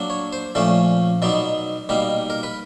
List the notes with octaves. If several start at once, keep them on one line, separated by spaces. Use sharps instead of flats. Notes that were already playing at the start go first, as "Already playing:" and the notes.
Already playing: F#3 A#3 D4
C#5
C5
A#2 F3 A3 C#4 D5
B2 F#3 B3 D#4 D5
B2 G3 A#3 D#4
A#4
B4